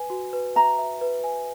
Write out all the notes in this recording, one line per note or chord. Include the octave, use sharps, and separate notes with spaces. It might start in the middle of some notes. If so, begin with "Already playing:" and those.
Already playing: B4 G#5
F#4
B4
E5 A#5
E5
B4
G#5